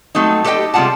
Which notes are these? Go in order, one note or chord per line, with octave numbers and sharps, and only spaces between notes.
F#3 A3 C4 D#4
G4 A4 B4 D#5 G5
C3 G3 G#3 F4 F#5 A5